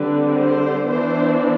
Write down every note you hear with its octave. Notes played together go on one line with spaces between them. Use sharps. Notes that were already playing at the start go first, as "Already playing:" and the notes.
Already playing: D3 G3 C4 B4
C5
E3 B3 D4 C5